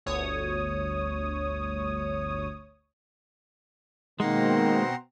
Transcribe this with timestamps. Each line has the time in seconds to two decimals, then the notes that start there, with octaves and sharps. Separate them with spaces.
0.06 G1 D2 C#5 D#6
4.20 B2 D#3 G#3 A#3 C4 F#5 A#5 C6